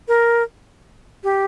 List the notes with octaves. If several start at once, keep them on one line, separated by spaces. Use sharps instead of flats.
A#4
G4